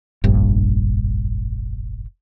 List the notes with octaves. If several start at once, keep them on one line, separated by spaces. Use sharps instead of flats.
F1 A#1 G2